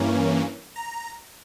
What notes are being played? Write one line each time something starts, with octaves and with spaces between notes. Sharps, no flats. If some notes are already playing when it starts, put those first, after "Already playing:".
Already playing: G2 E3 A#3 C#4
A#5